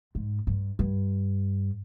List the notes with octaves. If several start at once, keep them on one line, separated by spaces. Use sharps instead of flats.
G#2
G2
G2